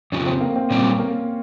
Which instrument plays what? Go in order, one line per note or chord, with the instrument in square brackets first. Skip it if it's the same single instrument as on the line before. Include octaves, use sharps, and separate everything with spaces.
[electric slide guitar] F2 C#3 F3 [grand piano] C#4
[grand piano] C4
A#3
C4
[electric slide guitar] A#2 G3 C4 [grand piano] C#4
[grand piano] A#3